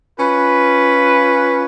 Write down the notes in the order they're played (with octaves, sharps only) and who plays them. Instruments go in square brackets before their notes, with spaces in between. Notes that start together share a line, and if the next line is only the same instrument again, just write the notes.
[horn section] C#4 F4 B4